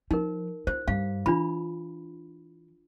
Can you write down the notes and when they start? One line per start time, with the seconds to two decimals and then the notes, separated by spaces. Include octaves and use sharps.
0.11 F3 D#4 A#4
0.67 F4 C5
0.88 G2 F5
1.26 E3 D4 F4 B5